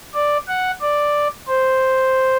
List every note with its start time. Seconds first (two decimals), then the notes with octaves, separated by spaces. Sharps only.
0.14 D5
0.48 F#5
0.81 D5
1.48 C5